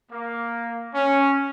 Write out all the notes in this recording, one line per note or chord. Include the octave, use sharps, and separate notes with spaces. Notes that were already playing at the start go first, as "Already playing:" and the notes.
A#3
C#4